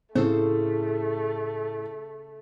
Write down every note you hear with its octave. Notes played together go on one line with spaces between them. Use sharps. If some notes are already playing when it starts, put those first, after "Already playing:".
A2 C#3 A3 C4 A4 C5